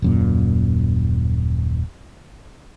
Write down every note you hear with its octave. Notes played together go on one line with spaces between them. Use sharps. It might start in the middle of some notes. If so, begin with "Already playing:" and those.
D#1 F#2 A#2